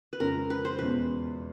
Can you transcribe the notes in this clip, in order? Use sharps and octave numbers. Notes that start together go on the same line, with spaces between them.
B4
F2 C#3 F3 G#3 C#4 A#4
B4
C5
E2 B2 G#3 C#4 F4 B4